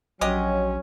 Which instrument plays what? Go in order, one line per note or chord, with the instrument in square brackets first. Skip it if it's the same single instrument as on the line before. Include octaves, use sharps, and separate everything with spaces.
[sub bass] A#1 [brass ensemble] F#3 [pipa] G#3 G4 D#5 [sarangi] C#4